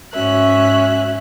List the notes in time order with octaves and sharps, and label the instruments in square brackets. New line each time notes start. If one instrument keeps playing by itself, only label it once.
[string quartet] G#2 C#4 F#4 E5 F#6